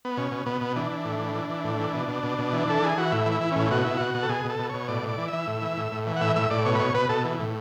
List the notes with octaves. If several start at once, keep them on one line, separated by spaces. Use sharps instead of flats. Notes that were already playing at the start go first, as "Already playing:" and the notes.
B3
B2 C#4
B2
B2 B3
B2
E3 D4
E3
A2
E3
E3
E3
A2
E3
B2
B2
B2
B2
E3
E3 A4
E3 G#4
E3 F#4
A2 E4
E3
E4
E3
A2 C#4
B2 F#4
B2 E4
B2 F#4
B2
A4
B2 G#4
B2 A4
B2
B2 C#5
A2 D5
A2
D5
E3
E3 E5
A2
E3
A2
A2
E3
F#5
A2 E5
A2 E5
A2 D5
B2 C#5
B4
B2 C#5
B2 B4
B2 A4
E3
A2